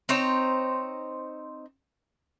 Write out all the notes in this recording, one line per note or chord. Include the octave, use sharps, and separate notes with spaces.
C4 D#4 C5 C#5